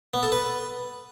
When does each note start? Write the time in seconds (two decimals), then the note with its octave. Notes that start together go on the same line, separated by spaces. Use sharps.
0.14 B3
0.23 A4
0.32 B4